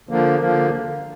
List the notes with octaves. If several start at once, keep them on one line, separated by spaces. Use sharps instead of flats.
D3 F3 A#3
D3 F3 A#3